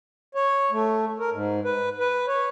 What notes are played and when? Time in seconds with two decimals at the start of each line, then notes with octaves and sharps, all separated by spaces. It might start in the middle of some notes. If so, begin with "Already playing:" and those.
0.35 C#5
0.71 A3
1.19 A#4
1.32 G#2
1.64 B4
2.00 B4
2.27 C#5